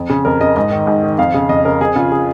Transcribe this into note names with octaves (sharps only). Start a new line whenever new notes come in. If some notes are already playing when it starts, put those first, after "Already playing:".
Already playing: F2
C#3
F2 A#4
C#3 D#5
G#2 D#5
D#3
G#2
D#3
F2 F5
C#3
F2 D#5
C#3 A#4
F2 G#4
C#3 F4
G#4